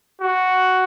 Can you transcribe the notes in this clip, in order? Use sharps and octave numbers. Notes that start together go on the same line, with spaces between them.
F#4